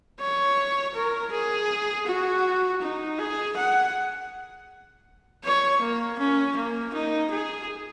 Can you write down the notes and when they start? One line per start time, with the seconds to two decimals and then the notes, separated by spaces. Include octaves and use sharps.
0.19 C#5
0.94 A#4
1.32 G#4
2.07 F#4
2.82 D#4
3.19 G#4
3.56 F#5
5.44 C#5
5.81 A#3
6.18 C#4
6.56 A#3
6.94 D#4
7.31 G#4